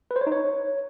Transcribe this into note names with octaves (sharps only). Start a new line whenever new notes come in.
B4
C5
C#5
D#4
C#5